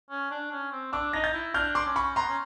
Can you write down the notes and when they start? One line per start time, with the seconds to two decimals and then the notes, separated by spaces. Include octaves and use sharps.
0.10 C#4
0.31 D4
0.51 C#4
0.72 C4
0.92 D4 D6 E6
1.13 D#4 A#6
1.24 G6 A6
1.34 E4
1.54 D4 F6 G6
1.75 C6 D6
1.85 C#4
1.96 B5 C#6
2.16 B3 A#5 C6
2.28 C#4